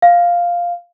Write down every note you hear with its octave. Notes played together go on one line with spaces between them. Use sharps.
F5